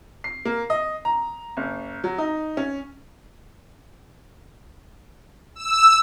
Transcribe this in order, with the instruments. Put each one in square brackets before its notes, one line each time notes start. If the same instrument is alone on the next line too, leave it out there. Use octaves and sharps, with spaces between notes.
[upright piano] C7
A#3
D#5
A#5
F#1
F#3
D#4
C#4
[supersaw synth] E6